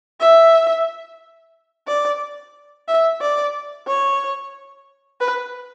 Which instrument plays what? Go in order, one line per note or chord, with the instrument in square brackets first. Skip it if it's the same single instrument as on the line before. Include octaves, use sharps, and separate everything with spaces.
[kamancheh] E5
D5
E5
D5
C#5
B4